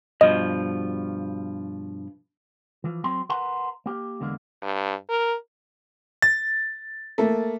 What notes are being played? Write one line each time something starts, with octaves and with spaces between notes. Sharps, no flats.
G2 B2 F3 D#5
E3 F3
F#3 C4 G5 C6
A#4 B4 F#5 A#5 C6
A#3 G4
E2 D3 G#3 A#3
G2
A#4
A6
A3 A#3